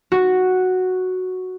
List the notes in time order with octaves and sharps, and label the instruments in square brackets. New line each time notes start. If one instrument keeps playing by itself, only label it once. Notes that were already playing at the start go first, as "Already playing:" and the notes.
[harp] F#4